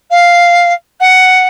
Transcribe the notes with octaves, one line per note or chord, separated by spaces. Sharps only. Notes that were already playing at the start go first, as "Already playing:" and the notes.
F5
F#5